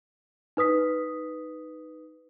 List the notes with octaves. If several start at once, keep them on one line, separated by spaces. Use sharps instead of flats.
D#4 B4 D#6 B6